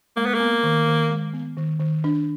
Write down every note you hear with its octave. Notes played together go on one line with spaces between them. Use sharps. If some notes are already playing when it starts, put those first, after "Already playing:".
G#3 A#3
B3
A#3
B3
D#3
D#3
G#3
B3
D#3
D#3
D4